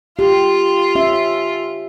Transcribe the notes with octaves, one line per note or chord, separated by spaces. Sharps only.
F4 G4
C#4 E5